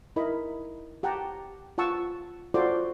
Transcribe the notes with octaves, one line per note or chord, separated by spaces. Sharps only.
D#4 E4 A#4 D#5 B5
G4 F#5 G5 A5 A#5
F4 F#5 A5 C#6 E6
F4 F#4 A4 C5 D5 D6